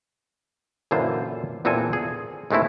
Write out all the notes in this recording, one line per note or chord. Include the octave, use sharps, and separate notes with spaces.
F#2 A#2 D3 E3 F4 C5
E2 A#2 C4 D4 A4 G#5
G#4
D#2 G#3 A3 C4 E4